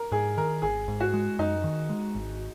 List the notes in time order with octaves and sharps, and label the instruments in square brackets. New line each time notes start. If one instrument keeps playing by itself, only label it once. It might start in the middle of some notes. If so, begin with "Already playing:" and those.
Already playing: [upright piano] A#4
[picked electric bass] G#2 [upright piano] G#4
[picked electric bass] D#3 [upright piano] A#4
[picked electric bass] G#1 [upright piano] G#4
[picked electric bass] G#2
[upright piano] F#4
[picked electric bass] G#3
[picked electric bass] F#2 [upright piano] D#4
[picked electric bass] D#3
G#3
G#1